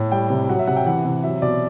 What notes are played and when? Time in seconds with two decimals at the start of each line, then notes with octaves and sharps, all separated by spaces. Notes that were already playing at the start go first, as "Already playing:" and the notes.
Already playing: A2
0.12 G3 G5
0.30 C3
0.49 F#3 F#5
0.59 E5
0.67 C3 F#5
0.77 G5
0.86 E3 F#5
1.05 C3
1.23 F#3 E5
1.42 B2 D5